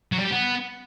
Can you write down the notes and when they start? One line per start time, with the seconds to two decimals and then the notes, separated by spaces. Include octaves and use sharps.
0.12 F#3
0.18 G3
0.25 G4
0.31 B3